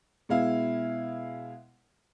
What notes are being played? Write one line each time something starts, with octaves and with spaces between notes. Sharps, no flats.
B2 G#3 E4 F5